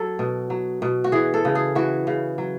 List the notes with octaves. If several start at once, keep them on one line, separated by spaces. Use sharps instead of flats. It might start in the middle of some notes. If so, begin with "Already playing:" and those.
Already playing: F#3 A4
B2
F#3
B2
F#4
E3 G#4
A4
C#3
G#4
E3 F#4
C#3
F#3